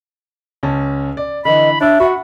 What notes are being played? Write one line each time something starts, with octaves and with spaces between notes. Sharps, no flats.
C#2 C#4 A5
D5
D3 E3 D#5 B5
D4 C#5 E5 E6
F#4 F#5 B5